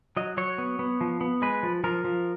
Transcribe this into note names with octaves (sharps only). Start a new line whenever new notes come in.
F#3 D#5
F#3 C#5
B3
B3
F3
B3
G#3 B4
F3
F3 A#4
F3